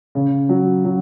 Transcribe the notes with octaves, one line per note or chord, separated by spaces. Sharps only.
C#3
F#3
F#3